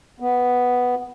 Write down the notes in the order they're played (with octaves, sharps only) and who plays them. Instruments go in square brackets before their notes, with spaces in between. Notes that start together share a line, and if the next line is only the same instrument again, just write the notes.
[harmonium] B3